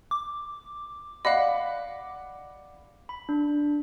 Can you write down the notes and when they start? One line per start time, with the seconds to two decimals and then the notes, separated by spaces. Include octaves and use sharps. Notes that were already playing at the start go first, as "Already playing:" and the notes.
0.11 D6
1.25 D5 D#5 F5 F#5 B5
3.09 B5
3.29 D4